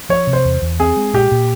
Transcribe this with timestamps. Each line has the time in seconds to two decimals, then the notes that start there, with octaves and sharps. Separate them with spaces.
0.09 F3 C#5
0.27 C3
0.33 C5
0.45 E2
0.62 E2
0.80 C4 G#4
0.97 G#3
1.13 A#2 G4
1.31 A#2